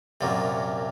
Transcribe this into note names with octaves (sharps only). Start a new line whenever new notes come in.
C2 F#2 A#2 F#3